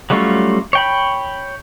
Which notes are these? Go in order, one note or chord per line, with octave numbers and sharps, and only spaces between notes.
F#3 G3 A3 C#4 F4
C#5 G5 B5